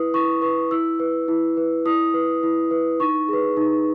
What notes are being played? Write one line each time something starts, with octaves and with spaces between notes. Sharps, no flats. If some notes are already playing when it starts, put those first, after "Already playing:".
Already playing: E4 B4 D#6
E4 C#6
B4 C#6
E4 E6
B4
E4
B4
E4 D#6
B4
E4
B4
D#4 C#6
G#4 B4
D#4